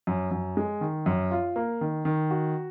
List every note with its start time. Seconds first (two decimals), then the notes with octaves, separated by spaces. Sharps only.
0.07 F#2
0.31 F#2
0.57 G#3
0.81 D#3
1.06 F#2
1.31 F4
1.56 A#3
1.81 D#3
2.05 D#3
2.31 F#4